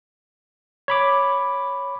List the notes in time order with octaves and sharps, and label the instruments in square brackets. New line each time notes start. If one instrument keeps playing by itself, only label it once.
[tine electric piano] C#5 B5 D6